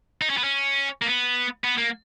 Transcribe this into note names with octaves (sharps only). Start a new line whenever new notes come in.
D#4
C#4
B3
C#4
A#3
B3
B3
A#3